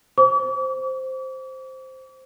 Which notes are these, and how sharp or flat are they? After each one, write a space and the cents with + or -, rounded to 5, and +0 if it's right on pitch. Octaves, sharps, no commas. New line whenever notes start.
C5 +0 D6 -40